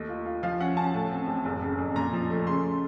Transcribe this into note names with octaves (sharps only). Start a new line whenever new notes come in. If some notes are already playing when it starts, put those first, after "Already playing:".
Already playing: D#2 A3 D#5
F4
F4
F3 F5
C#4 F#5
C#4 A5
A2
C4
A1
F#1
C#3
F2
A#2 A#5
F3
A3
C#3 C6